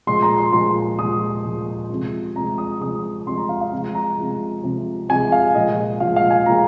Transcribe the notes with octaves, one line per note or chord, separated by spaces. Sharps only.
A#2 F3 G#3 C6
A#5
C6
A#2 F3 G#3 C6
A#2 F3 G#3 D#6
A#2 F3 G#3
C3 F3 G#3
C3 F3 G#3 A#5
D#6
C3 F3 G#3 D#6
C3 F3 G#3 C6
A#5
F5
F5
C3 F3 G#3
A#5
C3 F3 G#3
C3 F3 G#3
C3 F3 G#3 G#5
F5
A#2 F3 G#3 D#5
A#2 F3 G#3 F5
F5
G#5
A#2 F3 G#3 A#5